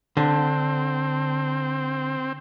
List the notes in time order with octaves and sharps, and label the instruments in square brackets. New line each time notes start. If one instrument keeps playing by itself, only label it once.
[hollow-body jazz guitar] D3 [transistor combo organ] C4